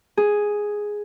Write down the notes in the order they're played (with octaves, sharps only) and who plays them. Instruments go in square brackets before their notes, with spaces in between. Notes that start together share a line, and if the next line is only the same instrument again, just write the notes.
[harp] G#4